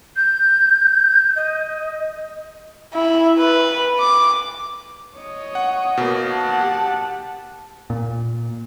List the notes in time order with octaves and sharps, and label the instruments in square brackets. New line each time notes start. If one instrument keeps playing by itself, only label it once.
[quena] G6
D#5
[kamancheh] E4
B4
D6
[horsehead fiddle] C#5 D#5
[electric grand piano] F#5
B2 A#3
[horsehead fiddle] F#5 A5
[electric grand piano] G4
[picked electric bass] A#2